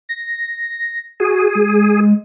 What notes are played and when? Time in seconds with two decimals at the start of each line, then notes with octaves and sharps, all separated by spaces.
0.09 A#6
1.20 F#4 G#4
1.55 G#3